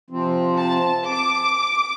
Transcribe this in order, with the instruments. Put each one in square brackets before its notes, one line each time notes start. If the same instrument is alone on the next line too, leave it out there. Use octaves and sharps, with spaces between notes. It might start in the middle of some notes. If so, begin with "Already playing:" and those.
[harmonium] C3 F3 C4
[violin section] A5
D6